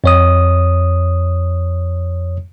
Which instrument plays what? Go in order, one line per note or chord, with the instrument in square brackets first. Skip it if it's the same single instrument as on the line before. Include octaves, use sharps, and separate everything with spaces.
[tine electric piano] F2 C#5 D#6